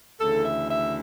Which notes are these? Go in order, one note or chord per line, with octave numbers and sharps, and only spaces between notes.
D2 C#3 E3 A4
E5
E5